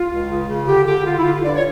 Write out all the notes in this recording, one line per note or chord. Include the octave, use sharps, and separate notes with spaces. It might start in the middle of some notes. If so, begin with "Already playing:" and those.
Already playing: F4
C#2
C#3
C#3
D3 G4
D3 G4
D3 F4
E4
D3 F4
G2 D5
C#5